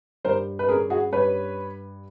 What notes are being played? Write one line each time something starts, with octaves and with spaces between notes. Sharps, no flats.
G2 A#4 C5
B4
C#4 G#4 A#4
F#4 G#4
G2 B4 C#5